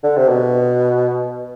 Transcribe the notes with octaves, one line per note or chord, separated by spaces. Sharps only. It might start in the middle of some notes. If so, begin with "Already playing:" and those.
D3
C3
B2